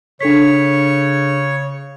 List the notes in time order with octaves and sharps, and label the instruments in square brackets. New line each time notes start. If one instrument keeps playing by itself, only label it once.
[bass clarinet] C#3 [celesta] D4 A4 B6 [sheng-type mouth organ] C#5